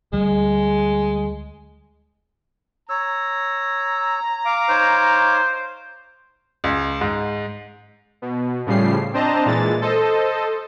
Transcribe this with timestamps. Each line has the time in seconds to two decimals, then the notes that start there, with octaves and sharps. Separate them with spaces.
0.13 D2 G3 G#3
2.89 C#5 A#5 E6
4.45 F5 D6
4.69 D#4 C5 C#5
6.64 C#2
7.01 G#2
8.22 B2
8.66 A2 C#3 F3 G3 C7
9.14 C4 D4 C5 D#5 A5 A#5
9.46 A#2 E3 G#3 A6
9.82 A4 C5 D#5